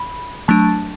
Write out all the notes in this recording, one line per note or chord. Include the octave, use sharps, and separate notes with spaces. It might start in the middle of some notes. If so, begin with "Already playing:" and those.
Already playing: B5
F#3 A3 D4 A5